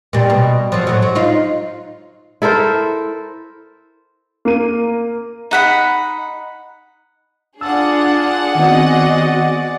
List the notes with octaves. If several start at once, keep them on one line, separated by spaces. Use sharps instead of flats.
A#2 G3
B2
F3 F#3
A2 F#3
F#3
D#4 F4
E4 A4 A#4 C5
A#3 D#7
D#4 F#5 B5
D4 F4 G#4 F#5 A5 E6
D#3 B3 C4 F#4 D5 D#5